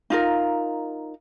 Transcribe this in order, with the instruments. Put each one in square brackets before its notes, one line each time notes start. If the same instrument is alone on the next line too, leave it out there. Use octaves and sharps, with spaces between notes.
[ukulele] D#4 F4 A#4